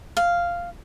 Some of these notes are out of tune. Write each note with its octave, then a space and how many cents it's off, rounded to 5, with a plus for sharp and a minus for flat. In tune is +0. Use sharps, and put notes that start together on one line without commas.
F5 -5